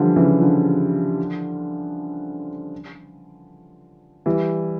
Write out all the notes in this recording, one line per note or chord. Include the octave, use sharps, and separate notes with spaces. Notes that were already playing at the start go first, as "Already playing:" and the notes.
Already playing: D3 E3 F3 G3
C#3 E3
D3 F3
E3 G3